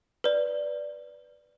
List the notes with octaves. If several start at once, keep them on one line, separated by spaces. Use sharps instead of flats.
B4 D5